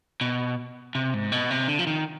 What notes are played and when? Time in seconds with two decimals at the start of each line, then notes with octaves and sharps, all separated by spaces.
0.21 B2
0.95 C3
1.14 G#2
1.32 B2
1.50 C3
1.68 D3
1.79 F3
1.87 D#3